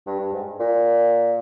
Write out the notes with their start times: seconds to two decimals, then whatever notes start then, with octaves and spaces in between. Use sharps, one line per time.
0.07 G2
0.19 G2
0.33 G#2
0.60 A#2